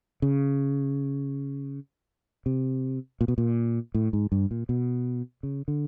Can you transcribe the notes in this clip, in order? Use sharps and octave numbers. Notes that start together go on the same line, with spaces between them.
C#3
C3
A#2
B2
A#2
A2
G#2
G2
A#2
B2
C#3
D3